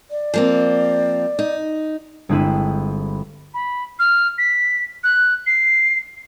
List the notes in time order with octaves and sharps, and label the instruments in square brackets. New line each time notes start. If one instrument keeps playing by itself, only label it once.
[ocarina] D5
[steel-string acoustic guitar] F3 A#3 C4
D#4
[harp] G1 G#3 C4 E4 B5 D#7
[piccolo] B5
F6
B6
F#6
C7